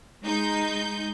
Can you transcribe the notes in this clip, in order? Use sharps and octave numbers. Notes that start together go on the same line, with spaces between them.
G#3 D#4 G6